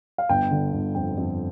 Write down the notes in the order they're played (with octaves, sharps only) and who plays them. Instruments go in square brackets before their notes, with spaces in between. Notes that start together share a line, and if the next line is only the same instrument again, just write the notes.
[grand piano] F5
G1 G5
D3
G1
F2 G5
F2